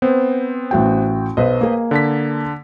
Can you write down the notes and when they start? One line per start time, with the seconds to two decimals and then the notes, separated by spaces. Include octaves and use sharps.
0.02 B3 C4 C5
0.71 A1 F#4 G5
1.37 B1 B4 C5 D#5
1.61 A#3 G#4
1.91 D3 A5 B6